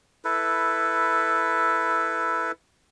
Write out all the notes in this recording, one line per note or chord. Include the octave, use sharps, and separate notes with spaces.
E4 A4 B4